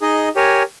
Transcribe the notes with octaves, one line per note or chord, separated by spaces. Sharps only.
D#4 G#4 D#5
G4 A#4 C#5 G#5